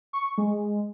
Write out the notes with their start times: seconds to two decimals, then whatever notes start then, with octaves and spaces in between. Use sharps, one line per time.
0.13 C#6
0.38 G#3